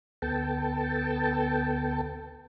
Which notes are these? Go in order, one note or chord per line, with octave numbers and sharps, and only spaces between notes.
D2 B3 A4 G5 A5